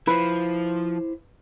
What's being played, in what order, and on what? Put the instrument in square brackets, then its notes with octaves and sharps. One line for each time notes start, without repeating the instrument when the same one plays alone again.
[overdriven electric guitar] F3 [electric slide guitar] E4 C5 [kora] B4